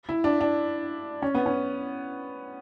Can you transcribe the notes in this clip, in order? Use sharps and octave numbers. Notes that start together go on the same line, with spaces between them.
E4
D4
D4
C#4
B3
C#4